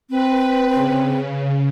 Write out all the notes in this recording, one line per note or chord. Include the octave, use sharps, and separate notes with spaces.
C4 B4
C#3